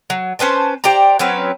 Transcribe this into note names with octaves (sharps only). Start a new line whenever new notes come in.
F#3
C#4 B4 C5 A5
G4 C5 D5 A#5
F#3 C4 C#4 B4